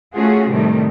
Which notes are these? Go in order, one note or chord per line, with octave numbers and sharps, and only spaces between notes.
A3 C#4 F4 F#4 G#4
A2 C3 D#3 G3 A3